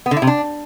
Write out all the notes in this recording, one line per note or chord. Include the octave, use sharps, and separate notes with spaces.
B3
D3
E4
C3
D4